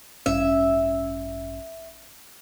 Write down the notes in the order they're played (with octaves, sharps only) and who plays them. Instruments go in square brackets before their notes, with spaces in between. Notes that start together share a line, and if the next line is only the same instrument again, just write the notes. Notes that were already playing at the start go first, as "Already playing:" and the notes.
[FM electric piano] A1 G2 C#4 [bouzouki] E5